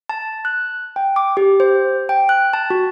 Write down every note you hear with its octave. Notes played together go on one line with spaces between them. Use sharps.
A5
F#6
G5
D6
G4
C5
G5
F#6
A5
F#4